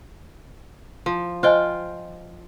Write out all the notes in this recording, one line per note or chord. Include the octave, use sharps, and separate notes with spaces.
F3
F4 C5 D#5 G5 G#5